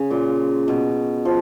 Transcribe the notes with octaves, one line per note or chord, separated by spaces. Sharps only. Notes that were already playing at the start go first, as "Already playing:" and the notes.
Already playing: C#3
A#2
B2
F3